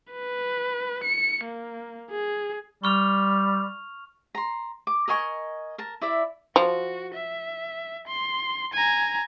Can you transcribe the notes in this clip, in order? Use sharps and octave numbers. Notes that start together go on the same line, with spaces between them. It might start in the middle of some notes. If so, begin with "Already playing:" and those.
B4
C#7
A#3
G#4
G3 C#6 F6 F7
A#5 C6
D6
A#4 D#5 G#5 C#6
A#4 A5
E4 D5 E5
F3 F#4
E5
C6
G#5 A#5